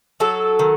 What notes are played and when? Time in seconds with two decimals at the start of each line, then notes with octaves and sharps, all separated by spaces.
0.20 F#3 A4
0.59 D#3